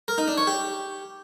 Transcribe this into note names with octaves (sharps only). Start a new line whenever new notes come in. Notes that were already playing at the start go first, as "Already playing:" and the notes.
A#4
D#4
D4
C#5
G4